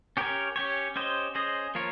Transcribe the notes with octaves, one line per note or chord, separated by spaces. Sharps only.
C#4 G4 A#4 C#5
C#4 G4 C#5
C#4 G4 C5 D#5
C#4 G#4 C5 D#5
F3 A#3 F4 A#4 C#5